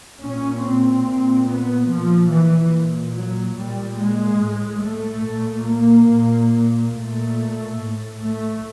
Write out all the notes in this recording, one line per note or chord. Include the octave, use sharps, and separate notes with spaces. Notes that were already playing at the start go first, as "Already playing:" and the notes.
A#2 C#4
C4
A#2
B3
A#2 F3
E3
A#2
F#3
A#2 G3
G#3
A2
A3
A#2
A#3
A#2
A#2 A3
A2
A3